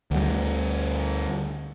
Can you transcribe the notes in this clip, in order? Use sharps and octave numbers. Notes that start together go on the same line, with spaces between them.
D2 G3